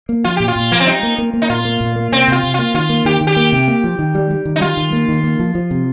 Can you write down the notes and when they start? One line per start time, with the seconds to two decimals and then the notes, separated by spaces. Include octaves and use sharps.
0.09 A#3
0.24 F3 F4
0.37 A#2 G4
0.48 F4
0.56 A#2
0.72 F3 A#3
0.80 C4
0.87 G3 D#4
1.03 A#3
1.18 A#3
1.34 A#3
1.42 D#4
1.49 A#2 F4
1.65 A#3
1.81 A#2
1.96 A#3
2.12 C3 C4
2.28 C3 F4
2.43 C3
2.54 A#3 F4
2.74 D#3 F4
2.89 A#3
3.05 D#3 G4
3.21 D#3
3.27 G4
3.37 A#3
3.52 C3
3.68 A#3
3.84 F3
3.99 D#3
4.15 G3
4.30 G3
4.45 D#3
4.56 D#4
4.61 G3 F4
4.77 D#3
4.93 A#3
5.09 D#3
5.24 A#3
5.40 F3
5.55 F3
5.71 C3